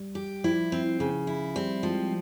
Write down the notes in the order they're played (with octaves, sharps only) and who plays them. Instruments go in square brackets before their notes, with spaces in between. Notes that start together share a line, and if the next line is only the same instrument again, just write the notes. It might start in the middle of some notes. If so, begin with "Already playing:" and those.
Already playing: [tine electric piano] G3
[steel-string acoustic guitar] G4
[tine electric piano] F3 [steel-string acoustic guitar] E4
[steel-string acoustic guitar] C4
C#3
E4
[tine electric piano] G3 [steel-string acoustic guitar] C4
[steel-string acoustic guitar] F3 [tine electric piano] G#3